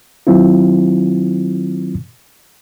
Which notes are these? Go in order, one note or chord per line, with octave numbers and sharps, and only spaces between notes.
D#3 F#3 C4 E4 F4